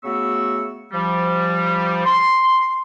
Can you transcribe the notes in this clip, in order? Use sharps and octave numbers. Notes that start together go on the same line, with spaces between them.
C#3 A3 B3 F#4 C#6 E6
F3 G3
C6